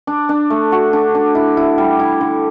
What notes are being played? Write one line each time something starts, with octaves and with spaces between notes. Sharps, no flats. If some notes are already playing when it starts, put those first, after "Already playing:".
D4
D4
A3
F#4
D4
D4
E4
E4
G3
E4
D3